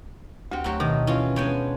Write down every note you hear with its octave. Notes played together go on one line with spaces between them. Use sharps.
D2 C4 F#4 G4 F#5
F#3 A3 F#4 G4 A#4
B2 D#3
E3 C#4 F4 A#4
G#3 B3 D4 C#5 G5 G#5